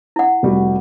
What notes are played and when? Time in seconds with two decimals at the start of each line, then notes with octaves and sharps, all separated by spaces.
0.16 E4 F#5
0.43 F1 G3 F#4